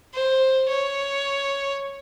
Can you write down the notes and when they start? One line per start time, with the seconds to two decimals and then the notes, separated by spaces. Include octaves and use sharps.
0.14 C5
0.68 C#5